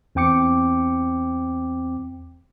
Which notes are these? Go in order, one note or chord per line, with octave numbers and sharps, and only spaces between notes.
E2 C4 G5 D6 C#7